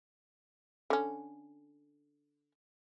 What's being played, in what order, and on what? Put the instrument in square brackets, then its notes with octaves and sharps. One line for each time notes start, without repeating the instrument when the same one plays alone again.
[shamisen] D3 C#4